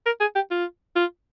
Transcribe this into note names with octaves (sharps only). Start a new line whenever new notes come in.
A#4
G#4
G4
F4
F4